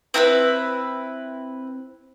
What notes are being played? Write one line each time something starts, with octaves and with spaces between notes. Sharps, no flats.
C4 E4 A#4 B4